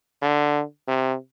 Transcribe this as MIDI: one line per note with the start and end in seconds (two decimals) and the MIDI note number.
0.22 0.62 50
0.88 1.15 48